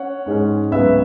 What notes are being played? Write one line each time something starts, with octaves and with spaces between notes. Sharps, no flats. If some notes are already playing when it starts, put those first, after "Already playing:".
Already playing: C#4 C#5 F#5
G#2 G#3 C#4
C#2 C#3 F#3 B3 B4 E5